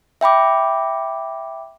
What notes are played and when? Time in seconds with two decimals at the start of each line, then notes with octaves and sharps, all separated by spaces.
0.21 E5 G5 B5 D6